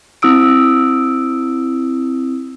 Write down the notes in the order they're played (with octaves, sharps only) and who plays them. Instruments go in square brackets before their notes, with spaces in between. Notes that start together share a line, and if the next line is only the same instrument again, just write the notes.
[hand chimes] C4 E4 D#6 E6 D7